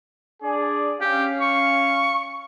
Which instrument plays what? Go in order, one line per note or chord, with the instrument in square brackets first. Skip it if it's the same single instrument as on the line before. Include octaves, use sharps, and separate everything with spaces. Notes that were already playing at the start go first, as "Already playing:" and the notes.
[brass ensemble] D4 G#4 D5
[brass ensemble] C#4 F5 [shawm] G4
[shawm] C#6